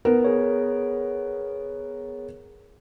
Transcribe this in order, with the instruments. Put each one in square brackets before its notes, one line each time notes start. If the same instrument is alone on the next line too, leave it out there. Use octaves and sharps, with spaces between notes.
[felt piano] B3 A#4
[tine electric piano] G#4 C#5